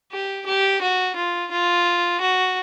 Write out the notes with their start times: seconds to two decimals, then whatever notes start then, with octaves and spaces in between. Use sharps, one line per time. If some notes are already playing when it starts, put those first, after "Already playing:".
0.12 G4
0.46 G4
0.82 F#4
1.16 F4
1.51 F4
2.21 F#4